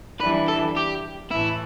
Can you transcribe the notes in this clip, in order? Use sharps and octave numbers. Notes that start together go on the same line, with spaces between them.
E3 G3 D4 B4
A4
G4
A2 E3 A3 E4